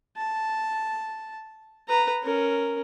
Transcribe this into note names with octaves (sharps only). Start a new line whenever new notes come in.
A5
B4 A#5
C#4 A#4